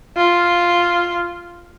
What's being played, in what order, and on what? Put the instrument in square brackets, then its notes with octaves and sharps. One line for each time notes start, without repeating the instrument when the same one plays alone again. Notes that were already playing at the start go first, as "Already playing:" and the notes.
[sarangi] F4